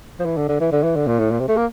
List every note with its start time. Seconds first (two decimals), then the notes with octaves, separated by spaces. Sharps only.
0.19 F3
0.25 E3
0.37 D3
0.48 D3
0.60 E3
0.72 D3
0.84 E3
0.96 D3
1.07 A#2
1.19 A2
1.31 A#2
1.40 C3
1.48 A3
1.57 A#3